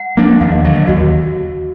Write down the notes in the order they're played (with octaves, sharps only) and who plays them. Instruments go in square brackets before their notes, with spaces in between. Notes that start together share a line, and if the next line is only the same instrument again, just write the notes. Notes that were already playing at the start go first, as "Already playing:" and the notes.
Already playing: [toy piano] F#5
[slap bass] F3 A#3 D4
[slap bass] D#2 [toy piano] F5
[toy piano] D#5
[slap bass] D3 F#3 [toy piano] D#5
[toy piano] D#5
[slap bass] D#2 [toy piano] F#4